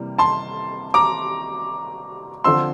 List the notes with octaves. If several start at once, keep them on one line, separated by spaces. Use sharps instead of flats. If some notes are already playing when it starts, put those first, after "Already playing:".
Already playing: C3 E3 G3 A#3
A5 C6
A#5 D6
D3 F3 C4 C6 E6